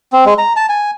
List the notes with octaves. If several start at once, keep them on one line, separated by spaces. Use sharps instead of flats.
C4
G#3
A#5
A5
G#5